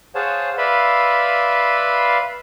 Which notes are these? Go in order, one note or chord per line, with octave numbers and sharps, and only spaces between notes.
G#4 C5 C#5 F5 F#5 A5
B4 D5 E5 F5 B5 C6